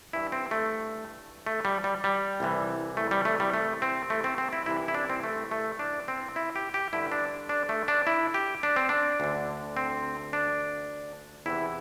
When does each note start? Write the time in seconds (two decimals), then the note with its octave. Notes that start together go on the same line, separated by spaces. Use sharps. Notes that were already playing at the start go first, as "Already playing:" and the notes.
0.13 G2 E3 E4
0.32 C4
0.51 A3
1.47 A3
1.65 G3
1.84 G3
2.04 G3
2.40 C2 C3 E3
2.97 A3
3.11 G3
3.25 A3
3.40 G3
3.54 A3
3.82 C4
4.10 A3
4.24 C4
4.38 C4
4.53 E4
4.66 C2 C3 E3 E4
4.88 E4
4.94 D4
5.10 C4
5.24 A3
5.51 A3
5.79 D4
6.08 C4
6.36 E4
6.56 G4
6.74 G4
6.93 G2 D3 E4
7.12 D4
7.49 D4
7.69 A3
7.88 D4
8.07 E4
8.34 G4
8.63 D4
8.76 C4
8.89 D4
9.20 D2 D3
9.77 C4
10.33 D4
11.46 E2 C3 E3 E4